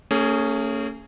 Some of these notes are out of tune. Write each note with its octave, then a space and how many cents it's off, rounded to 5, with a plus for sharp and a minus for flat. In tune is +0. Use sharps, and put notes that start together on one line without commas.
A3 +45 C#4 +0 G#4 +0